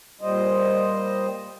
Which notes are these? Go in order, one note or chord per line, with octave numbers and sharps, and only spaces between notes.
A#2 G3 C5 D#5